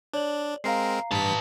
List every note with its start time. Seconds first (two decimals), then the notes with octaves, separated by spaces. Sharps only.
0.13 D4 C#5 D5 F#7
0.64 G#3 C4 A#4 F5 A#5 C7
1.11 G2 B4 A5 B6